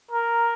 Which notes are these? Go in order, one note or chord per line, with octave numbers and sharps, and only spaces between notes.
A#4